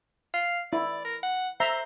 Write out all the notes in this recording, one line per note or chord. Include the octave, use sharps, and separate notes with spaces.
F5
E4 D5
A#4
F#5
C5 E5 A#5